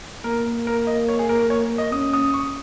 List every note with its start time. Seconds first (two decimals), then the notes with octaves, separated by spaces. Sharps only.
0.24 A#3 A#4
0.67 A#4
0.87 D#5
1.08 C#5
1.19 G#4
1.29 A#4
1.39 A#4
1.50 C#5
1.78 D#5
1.92 C#4 D#6
2.14 D#6
2.34 C#6